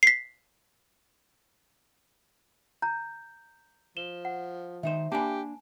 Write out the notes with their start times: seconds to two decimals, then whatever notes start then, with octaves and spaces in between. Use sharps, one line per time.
0.03 B6 C7
2.82 A#5 G6
3.97 F3 E7 G7
4.25 F#5
4.83 D#3 D#4 C5 E5
5.12 A#3 D4 G4 G#5 A5 B5